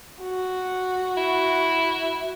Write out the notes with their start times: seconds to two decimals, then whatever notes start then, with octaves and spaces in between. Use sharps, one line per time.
0.22 F#4
1.17 E4